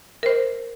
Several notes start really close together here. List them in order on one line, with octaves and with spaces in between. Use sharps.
A#4 C5 D#5